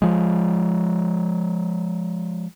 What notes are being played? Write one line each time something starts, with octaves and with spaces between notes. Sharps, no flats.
F3 G#3